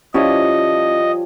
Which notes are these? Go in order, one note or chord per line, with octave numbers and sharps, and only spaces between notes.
F3 G3 C#4 E4 F4 C#5 D#5